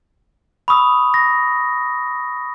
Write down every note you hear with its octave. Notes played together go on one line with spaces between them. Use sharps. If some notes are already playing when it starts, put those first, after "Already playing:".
B5 C#6 D#6 E6
A#6